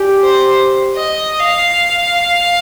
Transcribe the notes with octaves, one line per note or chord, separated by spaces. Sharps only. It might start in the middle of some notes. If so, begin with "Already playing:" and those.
Already playing: G4 D5 G#5
C5
D#5
F5